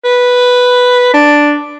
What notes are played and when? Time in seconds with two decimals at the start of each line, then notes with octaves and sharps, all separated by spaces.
0.05 B4
1.13 D4